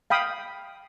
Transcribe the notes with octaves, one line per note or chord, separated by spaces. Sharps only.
F5 G5 B5 D#6